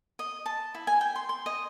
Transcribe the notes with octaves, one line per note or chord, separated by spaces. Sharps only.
D#5
A5
E4
G#5
G5
C6
C6
D#5